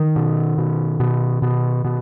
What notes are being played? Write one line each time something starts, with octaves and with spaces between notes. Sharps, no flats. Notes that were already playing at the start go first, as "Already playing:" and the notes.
Already playing: D#3
B2
B2
B2
B2
B2